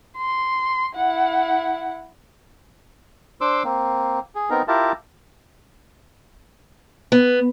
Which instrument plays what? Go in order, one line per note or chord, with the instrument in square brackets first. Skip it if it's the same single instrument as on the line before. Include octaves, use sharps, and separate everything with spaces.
[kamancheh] C6
E4 F#5
[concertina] D4 C5 C6 D6 E6
A#3 C4
G#4
B3 C4 D#4 A#4
E4 F4 G4 A#4 A5
[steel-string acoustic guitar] B3